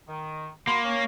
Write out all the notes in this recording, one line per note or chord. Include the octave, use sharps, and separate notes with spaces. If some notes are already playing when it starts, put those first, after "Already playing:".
D#3
A#3 F#4 B5 C6
C#4